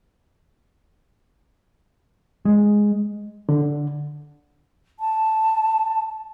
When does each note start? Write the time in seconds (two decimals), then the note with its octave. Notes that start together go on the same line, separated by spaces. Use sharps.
2.45 G#3
3.49 D3
5.00 A5